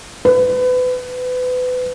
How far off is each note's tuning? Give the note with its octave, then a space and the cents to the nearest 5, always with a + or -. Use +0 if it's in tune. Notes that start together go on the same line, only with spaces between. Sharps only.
B4 +30